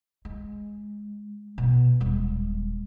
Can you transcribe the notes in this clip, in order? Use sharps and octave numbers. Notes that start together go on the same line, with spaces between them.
G#3
B2
D#1 G#3